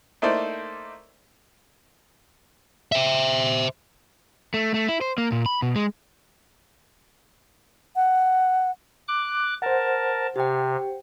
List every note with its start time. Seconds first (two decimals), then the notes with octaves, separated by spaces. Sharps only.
0.22 A3 A#3 D#4 E4 C5 D5
2.92 C5 E5
4.54 A3
4.74 A3
4.89 E4
5.01 C5
5.18 A#3
5.32 A#2
5.46 B5
5.62 B2
5.76 G#3
7.96 F#5
9.08 D6 F#6
9.62 A#4 C5 F#5 A5
10.36 C3 G4 G5